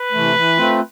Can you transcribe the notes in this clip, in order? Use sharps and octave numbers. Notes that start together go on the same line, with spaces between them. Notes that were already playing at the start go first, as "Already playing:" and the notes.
Already playing: B4
C3 E3 A3
E3
A3 C4 F4